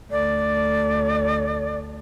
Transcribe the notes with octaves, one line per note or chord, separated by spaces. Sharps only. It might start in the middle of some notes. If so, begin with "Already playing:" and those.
D2 A3 D5